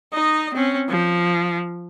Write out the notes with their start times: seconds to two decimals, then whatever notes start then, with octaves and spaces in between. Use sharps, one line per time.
0.13 D#4 D#5
0.54 C4 C#4
0.89 F3